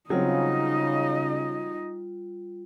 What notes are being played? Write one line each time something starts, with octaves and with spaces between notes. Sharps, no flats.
C#3 F#3 G3 C4 D#4 F4 D#5